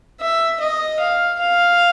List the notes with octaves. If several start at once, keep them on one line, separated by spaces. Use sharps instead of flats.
E5
D#5
F5
F5